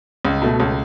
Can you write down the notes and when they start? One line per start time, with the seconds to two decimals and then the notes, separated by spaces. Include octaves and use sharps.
0.25 C#2
0.42 B2 A3
0.60 C#2